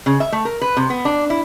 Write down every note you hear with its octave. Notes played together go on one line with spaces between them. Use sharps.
C#3
E5
A3
A#4
B4
C3
B3
D4
E4